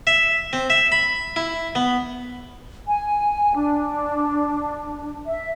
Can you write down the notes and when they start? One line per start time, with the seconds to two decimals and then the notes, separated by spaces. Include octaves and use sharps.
0.07 E5
0.53 C4
0.70 E5
0.92 B5
1.36 E4
1.75 B3
2.87 G#5
3.55 D4
5.26 E5